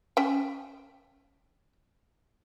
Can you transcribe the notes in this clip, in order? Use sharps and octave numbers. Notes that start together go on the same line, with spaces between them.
C#4 G5